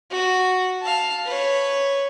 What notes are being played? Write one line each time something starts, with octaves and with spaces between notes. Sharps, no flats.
F#4
F5 A5
B4 C#5